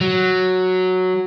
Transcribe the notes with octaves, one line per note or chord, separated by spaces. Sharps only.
F#3